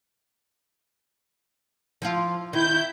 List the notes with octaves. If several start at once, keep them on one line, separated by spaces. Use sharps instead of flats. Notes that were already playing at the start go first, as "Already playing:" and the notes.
F3 E4 F4
D#3 E4 G6